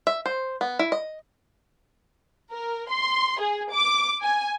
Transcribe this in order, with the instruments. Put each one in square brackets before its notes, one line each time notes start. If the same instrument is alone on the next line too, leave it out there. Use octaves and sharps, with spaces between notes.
[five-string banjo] E5
C5
B3
E4
D#5
[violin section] A#4
C6
G#4
D6
G#5